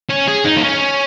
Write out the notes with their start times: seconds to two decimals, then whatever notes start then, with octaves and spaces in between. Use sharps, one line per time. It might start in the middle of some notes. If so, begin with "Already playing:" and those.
0.09 C#4
0.27 G#4
0.45 D#4
0.57 A#3
0.63 C#4